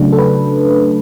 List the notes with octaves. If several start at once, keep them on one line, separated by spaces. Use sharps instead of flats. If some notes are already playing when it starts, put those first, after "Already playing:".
Already playing: C#3 F#3 A3 D4
A4
B4